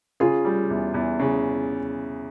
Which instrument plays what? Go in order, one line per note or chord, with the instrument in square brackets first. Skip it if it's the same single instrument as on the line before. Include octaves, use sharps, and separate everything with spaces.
[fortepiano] C#3 [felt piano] F4 G#4
[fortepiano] G3
E2
E2
C#3